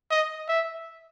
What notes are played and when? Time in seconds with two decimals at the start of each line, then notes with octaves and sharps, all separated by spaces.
0.11 D#5
0.49 E5